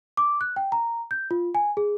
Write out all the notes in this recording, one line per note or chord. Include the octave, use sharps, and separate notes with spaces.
D6
F#6
G5
A#5
G6
F4
G#5
G#4